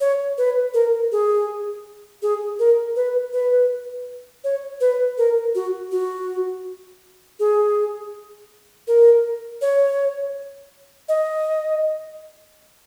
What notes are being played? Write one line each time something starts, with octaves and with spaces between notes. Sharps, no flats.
C#5
B4
A#4
G#4
G#4
A#4
B4
B4
C#5
B4
A#4
F#4
F#4
G#4
A#4
C#5
D#5